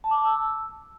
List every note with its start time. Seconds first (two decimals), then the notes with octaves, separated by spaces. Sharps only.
0.04 A5
0.11 D6
0.18 A5
0.25 E6